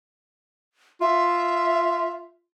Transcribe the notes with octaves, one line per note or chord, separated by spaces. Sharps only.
F4 E5